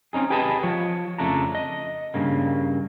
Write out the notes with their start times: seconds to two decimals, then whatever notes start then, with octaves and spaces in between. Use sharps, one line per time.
0.13 C4 C#4 D#4 G#4
0.30 G4 G#4 B4 D#5 F#5 A5
0.63 F3 C#5
1.18 F2 C#3 A3 D4 A#5
1.55 D#5
2.14 G2 C#3 A#3